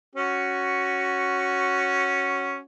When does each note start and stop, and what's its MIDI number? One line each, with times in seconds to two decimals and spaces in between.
0.15 2.59 61
0.15 2.59 66